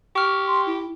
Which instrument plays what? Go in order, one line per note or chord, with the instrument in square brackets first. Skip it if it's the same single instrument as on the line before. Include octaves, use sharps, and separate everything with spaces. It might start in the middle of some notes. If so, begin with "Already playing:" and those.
[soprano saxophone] G4 [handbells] C#6 F6
[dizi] C6
E4